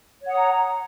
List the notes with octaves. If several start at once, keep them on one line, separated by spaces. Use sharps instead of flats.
C#5 F#5 A#5 D#6